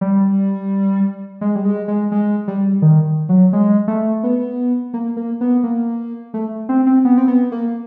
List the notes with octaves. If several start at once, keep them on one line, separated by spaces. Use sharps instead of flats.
G3
G#3
G3
G#3
G#3
G#3
G3
D#3
F#3
G#3
A3
B3
A#3
A#3
B3
A#3
A3
C4
C4
B3
C4
B3
A#3